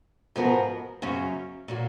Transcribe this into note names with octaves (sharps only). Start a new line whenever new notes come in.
G#2 F3 B3 F#4 A#4
F#2 C#3 F#3 C#4
A#2 F#3 A#3